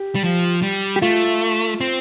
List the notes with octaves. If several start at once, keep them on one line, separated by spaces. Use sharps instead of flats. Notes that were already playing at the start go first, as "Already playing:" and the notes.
Already playing: G4
G3
F3
G3
G4
A3 F4
C4